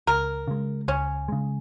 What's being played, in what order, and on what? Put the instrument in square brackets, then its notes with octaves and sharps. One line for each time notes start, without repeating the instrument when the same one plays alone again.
[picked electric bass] C#2 [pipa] A#4
[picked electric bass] C#3 G#3
[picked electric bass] C#2 [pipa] C#4
[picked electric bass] C#3 G#3